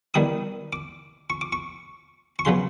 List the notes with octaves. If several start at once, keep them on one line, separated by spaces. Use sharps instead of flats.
D#3 G3 B3 E4 D#6
D6
C#6
D6
C#6
C#6
C#3 F#3 B3 C6